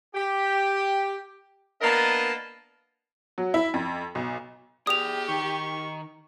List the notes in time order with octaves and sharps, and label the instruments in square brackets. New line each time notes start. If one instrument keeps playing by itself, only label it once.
[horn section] G4
A#3 B3 D4 A#4 D#5 A5
[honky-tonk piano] F#3
E4
F2
B1
[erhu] G4 [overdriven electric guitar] G#4 D5 [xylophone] D#6 F7
[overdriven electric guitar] D#3 [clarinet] C#6